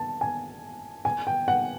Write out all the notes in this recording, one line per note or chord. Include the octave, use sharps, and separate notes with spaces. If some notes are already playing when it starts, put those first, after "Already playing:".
Already playing: A5
G#5
G#5
G5
F#5